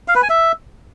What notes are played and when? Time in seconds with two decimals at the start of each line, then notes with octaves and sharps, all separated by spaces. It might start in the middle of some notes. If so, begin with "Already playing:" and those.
0.08 F5
0.15 B4
0.22 G#5
0.30 E5